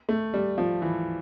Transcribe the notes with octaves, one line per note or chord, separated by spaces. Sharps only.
A3
G3
F3
E3